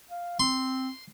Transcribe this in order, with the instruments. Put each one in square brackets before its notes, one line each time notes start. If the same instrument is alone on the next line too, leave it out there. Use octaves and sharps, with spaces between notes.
[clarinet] F5
[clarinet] C4 [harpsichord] C6